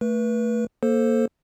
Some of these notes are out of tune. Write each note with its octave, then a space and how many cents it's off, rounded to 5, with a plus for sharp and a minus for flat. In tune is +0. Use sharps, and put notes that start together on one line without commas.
A3 +20 B4 -30
A#3 +0 A4 +0 C5 +5